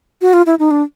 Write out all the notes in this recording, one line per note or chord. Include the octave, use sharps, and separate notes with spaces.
F#4
F4
E4
D#4
D4